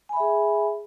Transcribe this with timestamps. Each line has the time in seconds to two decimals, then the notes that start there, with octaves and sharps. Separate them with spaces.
0.09 G#5
0.13 B5
0.16 E5
0.20 G#4